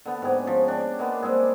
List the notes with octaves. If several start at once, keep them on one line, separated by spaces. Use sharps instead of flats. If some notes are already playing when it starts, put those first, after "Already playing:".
D3 B3
G#2 B3 G4 G#4
F3 C#4
D4 G4
G#3 A#3 B3
G3 G#3 C4 G#4